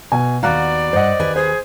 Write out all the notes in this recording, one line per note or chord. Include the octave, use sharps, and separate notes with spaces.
B2 G#5
D#2 B3 F#4 D5 F5 A#5 F#6
G2 C5 D#5 F#5
D#2 B4 G#5
G#4 C5